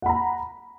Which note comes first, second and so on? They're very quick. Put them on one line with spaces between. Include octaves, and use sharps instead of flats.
F#5 B5 A#5